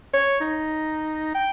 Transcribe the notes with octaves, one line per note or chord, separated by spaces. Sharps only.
C#5
D#4
G5